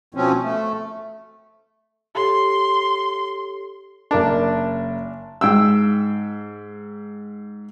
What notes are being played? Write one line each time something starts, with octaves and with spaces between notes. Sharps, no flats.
B2 F3 C4 C#4
A3
G4 A4 C#5 C6
F#1 D4 A#4 A5
G#2 G5 E6